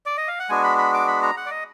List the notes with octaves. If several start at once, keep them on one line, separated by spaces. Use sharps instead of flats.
D5
D#5
F5
F#5
G#3 B3 D4 F#4 G#5
B5
B5
D6
B5
A#5
F#5
D5
D#5